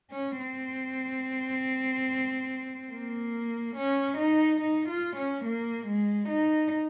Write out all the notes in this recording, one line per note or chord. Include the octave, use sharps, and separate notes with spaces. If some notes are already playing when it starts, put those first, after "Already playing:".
C#4
C4
A#3
C#4
D#4
D#4
F4
C#4
A#3
G#3
D#4